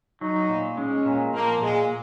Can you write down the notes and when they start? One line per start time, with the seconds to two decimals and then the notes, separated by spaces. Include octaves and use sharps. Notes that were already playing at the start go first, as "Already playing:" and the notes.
0.21 F#3 D#4
0.49 A#2
0.77 G#3 C#4
1.06 A#2
1.33 F3 A#3
1.61 A#2 G#3